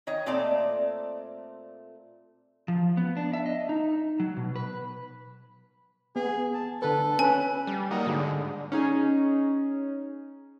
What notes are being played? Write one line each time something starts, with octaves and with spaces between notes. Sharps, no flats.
D#3 C#5 D#5
A#2 A3 C4 A4 D5 A#5
F3
B3
D4
E5
D#5
D#4
F#3
B2
B4
B3 G#4
A5
D3 A4 B4
C#4 B4 G#5
G3
F#3 A#3 D#4
G#2 D3
C#4 D#4 G#4